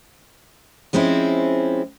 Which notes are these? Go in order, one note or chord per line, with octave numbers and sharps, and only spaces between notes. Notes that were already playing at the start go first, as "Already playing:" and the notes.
F3 G#3 C4 C#4 E4